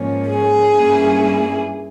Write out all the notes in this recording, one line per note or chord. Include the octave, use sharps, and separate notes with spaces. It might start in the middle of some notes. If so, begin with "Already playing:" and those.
Already playing: G#2 F3 A#3 C#4
G#4
G2 G3 A#3 C#4 E4